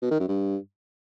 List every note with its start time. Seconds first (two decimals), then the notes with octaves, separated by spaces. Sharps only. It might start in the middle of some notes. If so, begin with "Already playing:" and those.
0.02 B2
0.11 D#3
0.19 F#2
0.28 G2